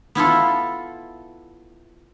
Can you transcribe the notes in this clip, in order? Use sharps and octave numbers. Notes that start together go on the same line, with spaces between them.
B3 E4 F4 A4